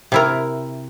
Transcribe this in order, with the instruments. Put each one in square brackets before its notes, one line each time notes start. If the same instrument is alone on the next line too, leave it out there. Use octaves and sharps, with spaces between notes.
[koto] C3 E4 A#4